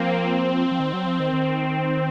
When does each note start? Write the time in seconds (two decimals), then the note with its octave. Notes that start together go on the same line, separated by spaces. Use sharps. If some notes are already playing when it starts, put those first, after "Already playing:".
Already playing: F3 A#3 C4
0.26 C4
0.71 F3
0.79 D#3
0.93 F#3
1.07 F3
1.20 D#3
1.33 D#3